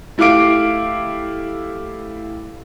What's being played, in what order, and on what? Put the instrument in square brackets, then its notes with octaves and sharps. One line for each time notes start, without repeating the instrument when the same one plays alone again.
[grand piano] A3 E4 G4 F5 D6 D7